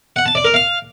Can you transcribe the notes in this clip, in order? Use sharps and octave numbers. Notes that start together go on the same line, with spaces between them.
F#5
A5
D5
A#4
F5